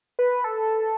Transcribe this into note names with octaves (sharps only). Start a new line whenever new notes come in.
B4
A4